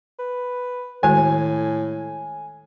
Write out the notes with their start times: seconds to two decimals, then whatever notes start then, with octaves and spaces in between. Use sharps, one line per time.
0.19 B4
1.03 A2 D#3 G#3 F#4 G#5